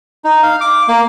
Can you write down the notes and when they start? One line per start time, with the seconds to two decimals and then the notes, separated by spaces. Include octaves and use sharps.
0.25 D#4
0.43 F5
0.61 D6
0.88 A#3